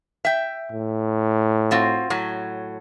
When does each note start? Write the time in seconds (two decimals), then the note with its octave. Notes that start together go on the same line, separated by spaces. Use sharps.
0.25 E5 G5
0.72 A2
1.71 C4 F4 F#4
2.10 A2 F#3